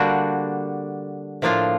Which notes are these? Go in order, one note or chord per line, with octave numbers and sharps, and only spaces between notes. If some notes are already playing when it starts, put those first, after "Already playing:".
Already playing: D3 G3 A#3 D4 F#4
A2 F3 A#3 D4 F4